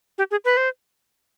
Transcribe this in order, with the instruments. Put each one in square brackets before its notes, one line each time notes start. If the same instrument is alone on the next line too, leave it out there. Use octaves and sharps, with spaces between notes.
[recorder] G4
G#4
B4
C5